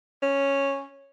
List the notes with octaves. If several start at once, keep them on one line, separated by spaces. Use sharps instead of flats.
C#4